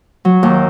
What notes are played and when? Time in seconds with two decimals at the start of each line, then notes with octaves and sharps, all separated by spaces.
0.25 F#3
0.43 D#2